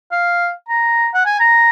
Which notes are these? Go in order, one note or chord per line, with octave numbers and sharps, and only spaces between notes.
F5
A#5
F#5
G#5
A#5